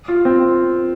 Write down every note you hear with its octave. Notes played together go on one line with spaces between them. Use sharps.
F4
C4